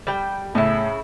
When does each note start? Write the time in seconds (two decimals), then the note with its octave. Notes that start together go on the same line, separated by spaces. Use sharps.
0.07 G3 G5
0.55 A2 C#3 E4